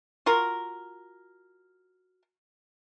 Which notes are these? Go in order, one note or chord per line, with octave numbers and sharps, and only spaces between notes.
F4 F#4 A#4